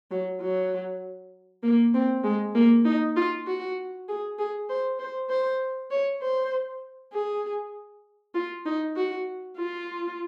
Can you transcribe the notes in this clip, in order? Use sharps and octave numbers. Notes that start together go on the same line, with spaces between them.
F#3
F#3
A#3
C4
G#3
A#3
D#4
F4
F#4
G#4
G#4
C5
C5
C5
C#5
C5
G#4
F4
D#4
F#4
F4